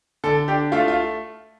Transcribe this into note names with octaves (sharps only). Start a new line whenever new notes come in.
D3 A4
D4 G4
A3 F4
F4